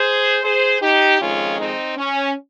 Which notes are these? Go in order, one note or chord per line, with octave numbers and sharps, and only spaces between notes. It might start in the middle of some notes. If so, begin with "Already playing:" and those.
Already playing: G#4 C5
G#4 C5
D#4 G4
F2 D#3 G#3 C#4 F4
C4 D#4
C#4